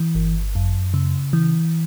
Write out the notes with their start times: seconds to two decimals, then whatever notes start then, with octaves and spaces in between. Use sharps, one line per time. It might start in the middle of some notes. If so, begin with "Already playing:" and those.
Already playing: E3
0.15 G1
0.55 F#2
0.94 C#3
1.33 E3